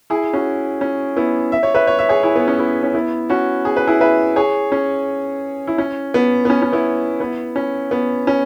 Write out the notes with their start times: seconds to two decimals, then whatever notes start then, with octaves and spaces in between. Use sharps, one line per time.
0.10 E4 G#4
0.33 C#4 F#4
0.81 C#4
1.17 B3 E4
1.52 E5
1.63 C#5
1.74 B4 E5
1.87 C#5
1.99 E5
2.09 G#4 C#5
2.23 E4 G#4
2.36 B3
2.48 C#4
2.59 B3 E4
2.83 C#4
2.94 B3 E4
3.29 C#4 F#4
3.65 G#4
3.77 B4
3.87 E4 G#4
4.01 B4 E5
4.36 G#4 C#5
4.72 C#4
5.67 E4
5.78 C#4
6.14 B3
6.45 B3
6.50 C#4
6.62 C#4
6.73 B3 E4
7.20 B3 E4
7.56 C#4
7.91 B3
8.27 C#4